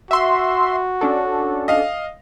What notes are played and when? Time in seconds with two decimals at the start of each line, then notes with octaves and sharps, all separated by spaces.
0.11 F#4 E5 C6
1.01 C#4 D4 A4
1.68 D#5 F5